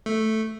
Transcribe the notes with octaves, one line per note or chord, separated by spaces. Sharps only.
A3